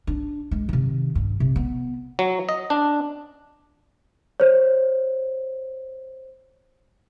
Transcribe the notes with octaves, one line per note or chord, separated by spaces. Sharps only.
D4
G#3
C3 D#3
G2
C3
B3
F#3
D#5
D4
C5 C#5